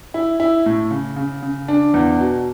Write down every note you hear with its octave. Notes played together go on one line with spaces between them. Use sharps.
E4
E4
A2
C#3
C#3
C#3
D4
E2
B2